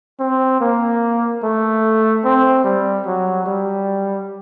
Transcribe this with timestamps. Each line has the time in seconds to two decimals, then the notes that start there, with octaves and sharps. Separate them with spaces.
0.19 C4
0.61 A#3
1.43 A3
2.24 C4
2.64 G3
3.06 F#3
3.46 G3